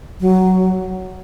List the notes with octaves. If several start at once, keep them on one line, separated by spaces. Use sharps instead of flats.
F#3